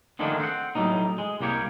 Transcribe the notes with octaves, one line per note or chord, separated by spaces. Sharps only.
D3 D#3 F3 G#3 A3 D4
C4 F#5
A2 F#3 G3 C4 D#4
G#3
C2 G3 A#3 G4 C#5